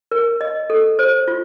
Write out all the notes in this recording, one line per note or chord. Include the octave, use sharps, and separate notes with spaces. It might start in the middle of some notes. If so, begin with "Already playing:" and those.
A#4
D#5
A4
C5
F4